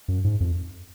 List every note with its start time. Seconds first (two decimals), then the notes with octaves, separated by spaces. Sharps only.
0.08 F#2
0.24 G#2
0.40 F2